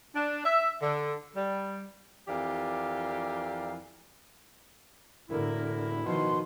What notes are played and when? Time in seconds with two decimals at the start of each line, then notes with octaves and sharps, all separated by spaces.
0.16 D4
0.46 E5
0.82 D3
1.36 G3
2.28 F2 E3 G4 A#4 D5 F5
5.29 E1 A2 D3 E4 A#4
6.05 B2 D#3 F3 C6